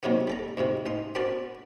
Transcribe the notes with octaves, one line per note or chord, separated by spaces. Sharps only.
D#2 C3 D#3 F#3 A#3 B3
G3 A4 A#5
D2 G#2 C3 D#3
A1 D#4 C6
B3 C4 D4 F#4 A#4 A5